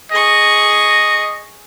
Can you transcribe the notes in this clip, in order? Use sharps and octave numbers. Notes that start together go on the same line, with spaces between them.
G#4 D#5 C#6